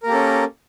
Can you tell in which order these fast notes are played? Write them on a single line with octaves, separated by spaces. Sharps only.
A#4 A#3 G4 A4 C#4